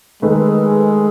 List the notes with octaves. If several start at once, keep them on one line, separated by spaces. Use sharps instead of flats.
D#3 G#3 A3 D#4 G#4 B4